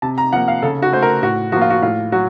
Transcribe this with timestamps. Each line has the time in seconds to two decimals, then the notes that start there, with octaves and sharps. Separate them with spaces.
0.02 C3 A5
0.18 A#5
0.33 F3 A#3 F#5
0.48 F5
0.62 C#3 A4
0.82 F#4
0.92 A3 C5
1.02 A#4
1.23 A2 F#4
1.52 F3 A#3 F#4
1.61 F4
1.70 F#4
1.82 A2 F4
2.12 F#3 F#4